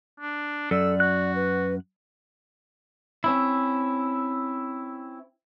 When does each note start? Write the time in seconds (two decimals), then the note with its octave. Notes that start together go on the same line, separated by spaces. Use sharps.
0.20 D4
0.71 F#2 A4 D5 E6
1.00 F#4 F#6
1.35 B4
3.24 C4 C#4 E4